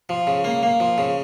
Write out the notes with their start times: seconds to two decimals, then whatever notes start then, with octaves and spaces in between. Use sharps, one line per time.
0.09 F3
0.27 C#3
0.44 A#3
0.63 A#3
0.80 F3
0.98 C#3